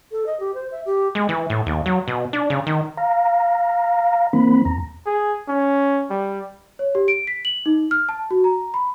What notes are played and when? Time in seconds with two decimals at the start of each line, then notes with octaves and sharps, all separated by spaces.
0.12 A4
0.26 D#5
0.40 G4
0.54 C5
0.72 E5
0.86 G4
1.15 G#3
1.29 E3
1.50 A2
1.66 D#2
1.86 F#3
2.08 B2
2.33 D4
2.50 C#3
2.67 D#3
2.97 F5 A#5
4.33 E3 A#3 C4 B5
4.65 E2 A#5
5.06 G#4
5.48 C#4
6.10 G3
6.79 C#5
6.95 G4
7.08 D7
7.27 B6
7.45 F#7
7.66 D#4
7.91 F6
8.09 A5
8.31 F#4
8.44 A#5
8.74 B5